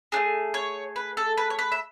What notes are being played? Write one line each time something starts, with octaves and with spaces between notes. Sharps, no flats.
A3 D4 G#4
C#5
B4
A4
B4
C#5
B4
E5